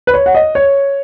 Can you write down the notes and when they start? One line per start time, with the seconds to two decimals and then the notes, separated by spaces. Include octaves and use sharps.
0.07 B4
0.14 C#5
0.26 F#5
0.35 D#5
0.55 C#5